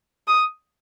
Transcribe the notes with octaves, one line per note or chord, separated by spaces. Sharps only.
D#6